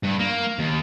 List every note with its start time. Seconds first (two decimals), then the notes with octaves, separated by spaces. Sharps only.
0.03 G2
0.19 A#3
0.59 D#2